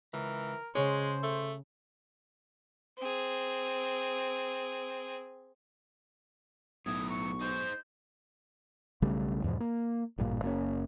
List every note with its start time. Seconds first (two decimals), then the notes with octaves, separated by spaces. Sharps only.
0.14 C#2 E3 A#4
0.75 C#3 G#3 C5 C#5
1.23 A3
2.98 C4 G#4
6.86 B1 A2 F#3 D#6 G#6
7.10 C#6 C#7
7.41 D#4 G#4 C5 G6
9.02 B1 C#3 G3 A3
9.44 E2 G#2 B2 F3
9.60 A#3
10.18 A1 G2 A#2 A#3
10.42 F#1 A#3 C4 C#4